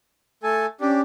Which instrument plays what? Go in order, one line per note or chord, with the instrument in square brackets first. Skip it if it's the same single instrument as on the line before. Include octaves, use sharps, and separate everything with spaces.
[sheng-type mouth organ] A3 A4 G#5
[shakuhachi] C#4 [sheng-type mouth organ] D4 G4